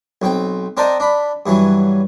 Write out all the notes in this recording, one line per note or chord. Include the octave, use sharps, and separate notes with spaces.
B1 C4 G5
C4 D4 A#4 C5 D#5 A5
D4 B5
G2 E3 F#3